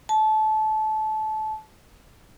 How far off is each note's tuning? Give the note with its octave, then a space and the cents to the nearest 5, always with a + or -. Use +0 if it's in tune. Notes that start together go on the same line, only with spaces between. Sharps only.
A5 -25